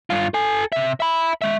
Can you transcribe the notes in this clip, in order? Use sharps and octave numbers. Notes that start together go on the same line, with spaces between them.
G2 F4
A4 G#5
C3 E5
E5 B5
G#3 E5